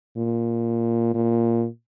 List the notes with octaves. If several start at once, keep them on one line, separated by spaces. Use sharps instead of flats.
A#2
A#2